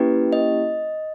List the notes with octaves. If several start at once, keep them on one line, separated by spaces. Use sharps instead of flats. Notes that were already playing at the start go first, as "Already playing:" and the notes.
Already playing: A#3 C#4 E4 G4 B4
D#5